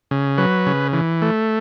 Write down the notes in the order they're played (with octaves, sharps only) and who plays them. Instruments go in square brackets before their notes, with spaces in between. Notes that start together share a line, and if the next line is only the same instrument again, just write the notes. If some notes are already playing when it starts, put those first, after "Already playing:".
[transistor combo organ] C#3
F#3 B4
C#3
E3
A3